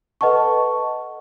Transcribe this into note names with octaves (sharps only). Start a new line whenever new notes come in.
A4 B4 D#5 F#5 A5 C#6